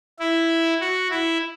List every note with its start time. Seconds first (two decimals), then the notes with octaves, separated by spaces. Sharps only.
0.19 E4
0.80 F#4
1.10 E4